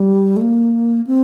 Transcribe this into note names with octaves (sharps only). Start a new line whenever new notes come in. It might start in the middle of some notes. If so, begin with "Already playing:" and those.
Already playing: G3
A3
A#3
C4